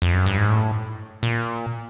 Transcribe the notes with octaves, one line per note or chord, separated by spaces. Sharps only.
F2
F#2
G2
G#2
A2
A#2